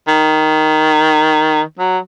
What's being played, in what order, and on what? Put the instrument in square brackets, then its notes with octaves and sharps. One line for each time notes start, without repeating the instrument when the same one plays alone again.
[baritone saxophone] D#3
F#3